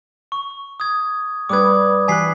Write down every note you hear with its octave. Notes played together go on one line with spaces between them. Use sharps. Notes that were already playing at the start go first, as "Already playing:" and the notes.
C#6
D#6 G#6
G2 B4 D6 D#6 G#6
E3 G4 G#5 F#6 B6 C7